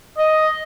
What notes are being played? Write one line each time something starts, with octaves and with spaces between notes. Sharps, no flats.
D#5